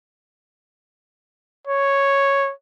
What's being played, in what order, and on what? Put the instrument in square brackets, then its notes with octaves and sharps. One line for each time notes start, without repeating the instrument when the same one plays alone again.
[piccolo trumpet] C#5